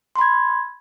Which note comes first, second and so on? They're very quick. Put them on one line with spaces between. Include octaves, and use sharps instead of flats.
C6 B5 G#6